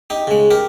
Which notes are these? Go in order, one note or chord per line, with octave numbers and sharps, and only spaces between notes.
D#4 G4
C#3 G#3
G4 A#4